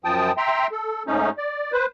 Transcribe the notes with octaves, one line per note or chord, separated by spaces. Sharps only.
F#2 F3 G5 A5 D#6
E5 G5 A#5 C6
A4
G#2 A3 C#4 D#4
D5
B4 C5